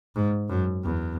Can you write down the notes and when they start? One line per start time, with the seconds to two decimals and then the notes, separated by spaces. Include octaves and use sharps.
0.15 G#2
0.49 F#2
0.83 E2